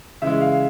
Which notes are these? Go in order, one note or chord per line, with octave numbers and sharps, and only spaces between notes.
C#3 E3 G#3 E5
F5